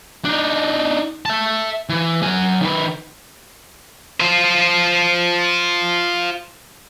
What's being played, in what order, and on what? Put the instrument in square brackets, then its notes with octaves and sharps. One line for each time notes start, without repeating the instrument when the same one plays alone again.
[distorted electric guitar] D4 D#4
E5 A5
E3
F#3 G#5
D#3 B4
F4 C5